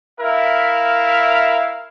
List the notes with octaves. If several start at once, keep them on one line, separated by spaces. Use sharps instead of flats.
E4 A#4 E5 F5